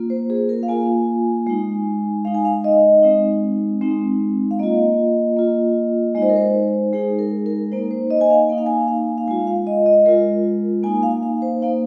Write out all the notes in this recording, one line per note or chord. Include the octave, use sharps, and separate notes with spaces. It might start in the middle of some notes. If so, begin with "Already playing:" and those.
Already playing: A#3 F4
C5
G#4
A#4
F5
A#3 F4 G#5
G#3 D#4
G#3 D#4 F5
G#5
F5
D#5
G#3 C4 D#4
G#3 C4 D#4
F5
A#3 F4 D#5
A#3 F4
G#3 D#4 D#5
C5
A#4
C5
G#3 D#4 G#4
A#4
A#4
A#3 D#4 C5
C5
D#5
G#5
F5
A#3 D#4 G#5
F5
G#5
F5
F5
G#3 F4 G#5
F5
D#5
D#5
G#3 F4 A#4
A#3 D#4 G#5
F5
F5
C5
A#3 D#4 F5